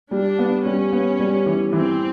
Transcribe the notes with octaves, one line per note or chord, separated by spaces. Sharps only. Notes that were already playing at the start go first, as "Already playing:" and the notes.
G3 D4
B3
G3 C#4
B3
G3
E3
E3 C4